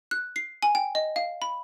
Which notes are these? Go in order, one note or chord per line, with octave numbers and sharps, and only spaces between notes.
F#6
C7
G#5
G5
D#5
F5
B5